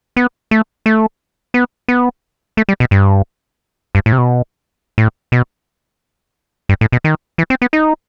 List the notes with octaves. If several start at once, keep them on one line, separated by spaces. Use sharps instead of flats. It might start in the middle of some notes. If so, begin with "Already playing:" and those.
B3
A3
A3
B3
B3
A3
G3
B2
G2
G2
A2
C3
B2
A2
B2
G2
A2
B2
D#3
E3
C4
B3
D#4